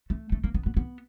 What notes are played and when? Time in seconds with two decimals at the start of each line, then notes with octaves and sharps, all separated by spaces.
0.10 A3
0.32 A3
0.44 A#3
0.54 B3
0.66 B3
0.77 B3